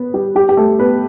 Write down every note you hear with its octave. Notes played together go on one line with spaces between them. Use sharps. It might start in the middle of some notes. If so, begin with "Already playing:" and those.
Already playing: B3 B4
G3 G4
G3 G4
G4
A3 A4
B3 B4